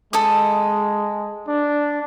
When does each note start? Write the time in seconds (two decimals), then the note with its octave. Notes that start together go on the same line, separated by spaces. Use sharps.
0.13 G#3 A4 D#5 D#6
1.48 D4